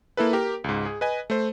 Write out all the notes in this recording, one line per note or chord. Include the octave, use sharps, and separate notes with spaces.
A#3 E4 A4 B4
G4 A#4
C#2 G#2
G#4
B4 D#5 G#5
A3 C5